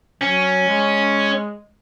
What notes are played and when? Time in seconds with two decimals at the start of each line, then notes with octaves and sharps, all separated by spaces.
0.21 F#3 C#4
0.67 G#3